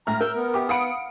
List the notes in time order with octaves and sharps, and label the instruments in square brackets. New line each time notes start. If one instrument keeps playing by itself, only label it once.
[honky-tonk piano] A2 F6 [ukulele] E5 [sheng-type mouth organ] A#5
[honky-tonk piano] A#4 [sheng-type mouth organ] E6 G6
[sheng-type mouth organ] B3
[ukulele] G4 A#4 E5 [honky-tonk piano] D6
[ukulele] F5 F#5 B5 [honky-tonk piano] D#6 C#7 D7